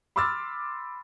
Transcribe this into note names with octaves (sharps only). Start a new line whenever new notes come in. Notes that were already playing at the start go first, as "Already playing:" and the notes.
B5 C6 D6 E6 F6 A6